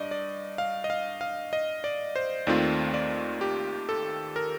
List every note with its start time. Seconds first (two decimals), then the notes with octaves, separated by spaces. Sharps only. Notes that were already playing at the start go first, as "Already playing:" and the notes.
Already playing: G2 D5 D#5
0.11 D5
0.58 F5
0.84 D#5
0.90 F5
1.21 F5
1.53 D#5
1.84 D5
2.16 C5
2.47 D#2 D#3 A3 C4 F4 D5
2.94 D5
3.41 G4
3.89 A4
4.36 A#4